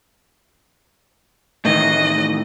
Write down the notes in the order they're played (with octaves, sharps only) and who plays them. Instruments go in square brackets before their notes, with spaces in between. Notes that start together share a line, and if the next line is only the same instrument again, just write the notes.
[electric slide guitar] A2 D#3 E3 [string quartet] D#5